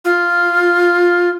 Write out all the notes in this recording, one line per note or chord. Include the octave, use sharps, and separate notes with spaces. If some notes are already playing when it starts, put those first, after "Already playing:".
F4